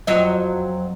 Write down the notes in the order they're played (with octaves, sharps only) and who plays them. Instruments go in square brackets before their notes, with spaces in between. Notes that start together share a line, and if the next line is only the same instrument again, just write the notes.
[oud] F2 F#3 D#5